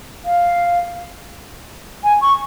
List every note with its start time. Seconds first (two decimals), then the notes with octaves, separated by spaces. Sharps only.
0.25 F5
2.03 G#5
2.21 C#6